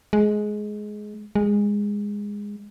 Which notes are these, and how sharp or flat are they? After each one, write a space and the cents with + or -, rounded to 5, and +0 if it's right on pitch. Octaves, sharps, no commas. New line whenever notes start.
G#3 +15
G#3 -15